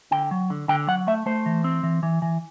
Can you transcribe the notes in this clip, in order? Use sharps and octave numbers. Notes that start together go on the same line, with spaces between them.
D3 G5
F#3
D3
D3 G5
F#3 F#5
A3 E5
A3 C5
E3
C4
E3
E3
E3